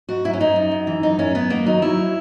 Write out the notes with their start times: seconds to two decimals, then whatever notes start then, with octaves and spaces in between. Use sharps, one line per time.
0.09 G#2 F#4
0.24 F#3 E4
0.33 C#4
0.40 F#2 D#4
0.56 F#2
0.71 F#2
0.87 E3
1.03 F#2 D#4
1.19 F#2 C#4
1.35 F#2 B3
1.50 D#3 A#3
1.66 F#3 D#4
1.82 F#3 E4
1.97 F#3